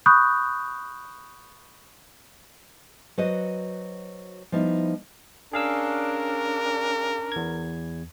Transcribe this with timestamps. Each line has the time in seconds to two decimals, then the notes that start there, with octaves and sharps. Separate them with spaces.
0.06 B5 C#6 D#6 F#6 G6
3.18 F#3 F#4 B4 C5 D#5
4.52 F3 G3 B3 D#4 E4
5.53 C#4 D4 G#4 A#4 F5 E6
7.32 E2 G#6